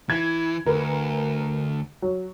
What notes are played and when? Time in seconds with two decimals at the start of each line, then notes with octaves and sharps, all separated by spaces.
0.10 E3 G#6
0.66 D2 A#4 B4
2.02 F#3